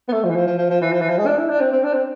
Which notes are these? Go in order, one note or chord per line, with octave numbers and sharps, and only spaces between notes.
B3
A3
F3
E3
F3
F3
F3
F3
E3
F3
E3
F3
G#3
D4
E4
D4
C4
C4
D4
C4